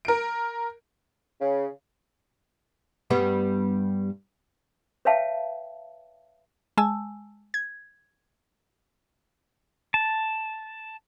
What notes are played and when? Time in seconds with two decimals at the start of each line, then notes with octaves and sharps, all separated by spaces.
0.05 A#4 D7
1.39 C#3
3.10 G2 G3 B3
5.05 B4 C#5 E5 F5 G5 A5
6.77 G#3 G#5 A5 E6
7.54 G#6
9.94 A5